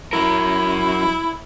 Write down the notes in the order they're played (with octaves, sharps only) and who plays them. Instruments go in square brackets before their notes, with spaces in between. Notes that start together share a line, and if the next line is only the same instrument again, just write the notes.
[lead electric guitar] F#3 A#4 [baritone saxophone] E4